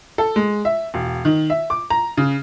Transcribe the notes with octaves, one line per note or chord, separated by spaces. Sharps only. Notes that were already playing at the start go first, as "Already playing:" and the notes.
A4
G#3
E5
E1
D#3
E5
D6
A#5
C#3